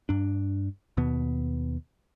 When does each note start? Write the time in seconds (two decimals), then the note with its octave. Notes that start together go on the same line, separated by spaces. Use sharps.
0.09 G2 D4
0.97 D#2 B2 B3